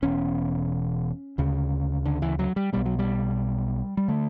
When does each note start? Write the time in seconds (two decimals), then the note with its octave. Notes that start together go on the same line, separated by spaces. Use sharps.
0.02 E1 E2 B2 C#4
1.38 D2 C#3
2.05 D3
2.22 E3
2.39 F#3
2.56 G3
2.73 B1 B2 G3
2.86 F#3
2.99 G3
3.97 G3
4.08 D3 A3